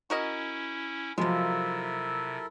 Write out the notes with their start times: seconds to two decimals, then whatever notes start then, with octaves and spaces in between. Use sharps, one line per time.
0.10 C#4 E4 F#4 A#4 D#5
1.18 C3 F3 F#3 G#3 A#3 E4 A4 A#4